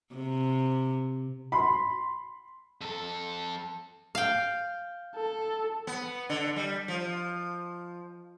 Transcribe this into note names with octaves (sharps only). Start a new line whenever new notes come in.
C3
B5 C6
F2 A4
F5 G5
A4
B3
D3
G3
F3